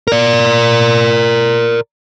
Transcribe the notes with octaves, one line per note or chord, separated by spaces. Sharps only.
A#4 D5